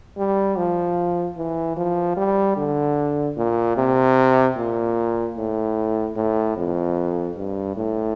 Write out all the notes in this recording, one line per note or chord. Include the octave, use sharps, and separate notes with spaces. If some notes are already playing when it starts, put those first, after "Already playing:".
G3
F3
E3
F3
G3
D3
A#2
C3
A#2
A2
A2
F2
G2
A2